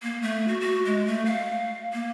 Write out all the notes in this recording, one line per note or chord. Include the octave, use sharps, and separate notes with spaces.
A#3
A3
F#4
F#4
G#3
A3
F5
A#3